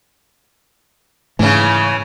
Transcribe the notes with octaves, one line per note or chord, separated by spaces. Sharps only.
G#2 C#3 E3 A3